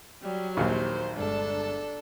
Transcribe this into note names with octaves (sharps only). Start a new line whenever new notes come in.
F#3 G3
A#1 D#2 D#3 C5
G1 G#3 D4 A4